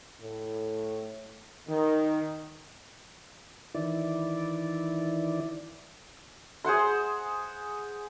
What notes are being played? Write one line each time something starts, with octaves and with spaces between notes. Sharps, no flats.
A2
D#3
D#3 E3 E4 D5
G#4 C5 F#5 C6